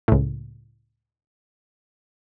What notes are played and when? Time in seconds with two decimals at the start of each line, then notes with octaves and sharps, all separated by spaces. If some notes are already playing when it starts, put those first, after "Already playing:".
0.08 C#2 A2